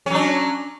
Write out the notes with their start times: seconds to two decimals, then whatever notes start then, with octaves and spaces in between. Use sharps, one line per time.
0.06 C#4
0.10 F#3
0.15 D4